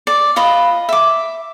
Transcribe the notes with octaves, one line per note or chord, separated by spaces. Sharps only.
D5
F4 B4 D#5
E5 D6